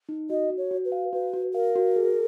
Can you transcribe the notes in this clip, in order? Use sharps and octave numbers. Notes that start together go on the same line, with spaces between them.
D#4
F#4 D#5
F#4
C#5
F#4
B4
F5
F#4 B4
F#4
A#4 F5
F#4
G#4